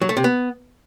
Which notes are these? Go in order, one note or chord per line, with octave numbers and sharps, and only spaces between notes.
F#3
A3
C3
B3